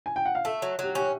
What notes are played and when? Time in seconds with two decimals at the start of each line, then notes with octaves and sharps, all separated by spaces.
0.06 G#5
0.16 G5
0.25 F#5
0.35 F5
0.45 A3 E5
0.62 F#3
0.79 F#3 G4
0.95 C#4 G4